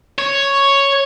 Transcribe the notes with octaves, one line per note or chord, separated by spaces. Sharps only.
C#5